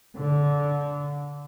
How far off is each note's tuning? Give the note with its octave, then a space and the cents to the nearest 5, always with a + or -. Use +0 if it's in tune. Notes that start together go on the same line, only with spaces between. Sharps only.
D3 -20